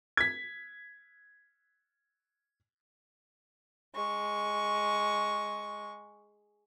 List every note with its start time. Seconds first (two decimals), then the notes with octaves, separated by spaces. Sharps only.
0.17 G#6 B6
3.95 G#3 C#6